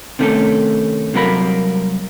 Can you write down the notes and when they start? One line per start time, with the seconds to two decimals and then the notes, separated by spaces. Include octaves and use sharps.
0.19 C3 D#3 A3 C#4 A4
1.13 C2 C3 F#3 A#3 A#4 B5